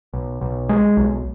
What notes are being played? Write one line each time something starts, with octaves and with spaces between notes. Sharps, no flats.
B1
B1
G#3
B1